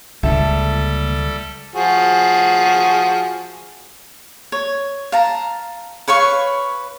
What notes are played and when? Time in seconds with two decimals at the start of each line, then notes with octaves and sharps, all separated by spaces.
0.23 C#2 D3 G3 A#3 A4 E5 A5
1.76 F3 F#4 G#4
4.52 C#5
5.12 F5 A5 A#5
6.08 B4 C#5 F5 C#6